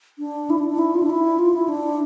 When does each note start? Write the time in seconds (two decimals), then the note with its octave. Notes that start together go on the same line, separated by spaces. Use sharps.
0.19 D4
0.50 E4
0.59 D4
0.70 D4
0.79 E4
0.94 F4
1.03 D4
1.10 E4
1.39 F4
1.54 E4
1.69 D4